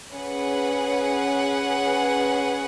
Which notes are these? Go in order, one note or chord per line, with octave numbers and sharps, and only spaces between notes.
C#4 G#4 B4 F#5